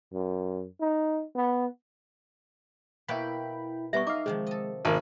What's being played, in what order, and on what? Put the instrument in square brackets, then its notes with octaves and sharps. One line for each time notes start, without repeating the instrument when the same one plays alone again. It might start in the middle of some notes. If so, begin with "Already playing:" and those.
[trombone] F#2
D#4
B3
[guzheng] B2 A#3 C#5 [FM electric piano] E4 G5 B5
[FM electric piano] G3 B3 [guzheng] G#4 A#4 F#5 [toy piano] E5 C#6
[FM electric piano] D#4 D#5 F5 [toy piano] D6
[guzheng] C3 D#3 F3 [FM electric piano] G#3
[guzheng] A4 D#5
[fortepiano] G#1 A#3 [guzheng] G#2 C3 D#4